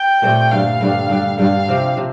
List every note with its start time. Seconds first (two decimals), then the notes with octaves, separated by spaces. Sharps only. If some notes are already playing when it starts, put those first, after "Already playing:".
Already playing: G5
0.22 A#2 A3 C4 G4
0.51 G2 D3 G3 F5
0.81 G2 D3 G3
1.09 G2 D3 G3
1.39 G2 D3 G3 F5
1.68 C3 F3 C4 G4
1.97 C3 F3